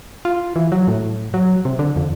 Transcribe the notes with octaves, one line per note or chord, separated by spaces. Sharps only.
F4
E3
F#3
A2
F#3
C3
D3
F2